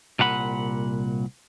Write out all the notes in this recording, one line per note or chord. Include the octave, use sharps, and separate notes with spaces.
C2 A#2 F#5 B5